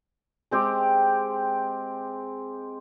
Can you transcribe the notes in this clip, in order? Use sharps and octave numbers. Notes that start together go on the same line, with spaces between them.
G#3 C4 G4